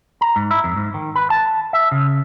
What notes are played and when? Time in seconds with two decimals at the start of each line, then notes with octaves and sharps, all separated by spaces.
0.21 A#5
0.36 G#2
0.51 E4
0.64 F2
0.76 G#2
0.94 D#3
1.16 B4
1.30 A5
1.73 E5
1.92 C#3